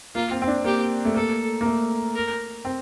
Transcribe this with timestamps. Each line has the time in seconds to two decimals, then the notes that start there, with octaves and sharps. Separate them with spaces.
0.15 A#3 F4
0.31 C4
0.42 C4
0.48 D4
0.64 A#3 G4
1.05 A3
1.14 A#3 A4
1.61 A#3
1.65 A3
2.15 A#4
2.65 C4